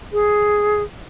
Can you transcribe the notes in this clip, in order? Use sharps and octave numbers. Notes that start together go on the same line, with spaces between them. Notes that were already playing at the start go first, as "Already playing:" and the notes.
G#4